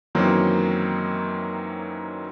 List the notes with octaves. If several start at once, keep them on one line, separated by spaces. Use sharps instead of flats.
F#2 D#3 E3 F#3 A#3 C4